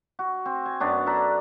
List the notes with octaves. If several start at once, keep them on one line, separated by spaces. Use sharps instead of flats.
F#4
C4
G#5
F#2 B3 D4 C#5
A4 B4 D5 A#5